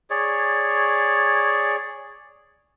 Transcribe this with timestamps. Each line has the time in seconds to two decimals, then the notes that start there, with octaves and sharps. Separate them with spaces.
0.10 G#4 C#5 D5